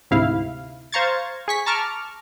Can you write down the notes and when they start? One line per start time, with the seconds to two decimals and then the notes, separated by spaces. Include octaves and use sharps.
0.11 D2 G#2 C3 E4 F5
0.92 C5 F5 A#5 C#6 G#6 A6
1.48 G#4 C#6 B6
1.66 A5 A#5 C#6 D6 F6